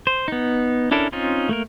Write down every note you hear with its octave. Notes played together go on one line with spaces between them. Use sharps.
C5
B3 D#4
C#4 D4 E4 A4 A#4
C4 C#4 D#4 F4
A3 A#3 A#4